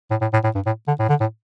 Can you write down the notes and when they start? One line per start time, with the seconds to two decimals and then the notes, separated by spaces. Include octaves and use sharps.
0.11 A2
0.21 A2
0.33 A2
0.44 A2
0.55 G2
0.66 A2
0.88 D3
0.99 A2
1.09 D3
1.21 A2